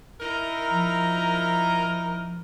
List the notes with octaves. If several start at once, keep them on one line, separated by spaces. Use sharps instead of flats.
D#4 E4 A#4
F3